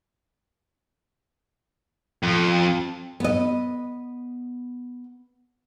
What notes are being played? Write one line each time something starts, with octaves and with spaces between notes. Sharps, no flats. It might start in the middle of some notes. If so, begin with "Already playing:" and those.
F2
B3 D#5